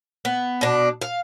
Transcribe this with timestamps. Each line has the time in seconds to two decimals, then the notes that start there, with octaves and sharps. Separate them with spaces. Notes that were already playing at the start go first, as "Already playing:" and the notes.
0.25 B3
0.61 B2 D4
1.02 F5